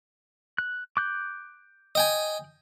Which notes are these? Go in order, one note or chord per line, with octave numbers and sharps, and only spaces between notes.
F#6
D6 F#6 G6
D#5 G5 G#5